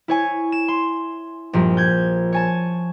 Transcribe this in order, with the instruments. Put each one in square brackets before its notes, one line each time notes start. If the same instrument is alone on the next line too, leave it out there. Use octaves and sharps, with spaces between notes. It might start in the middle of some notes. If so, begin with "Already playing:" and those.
[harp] E4 C#5 G#5
E7
C6
A#1 G2 F3
G6 G#6
C#5 G#5 A5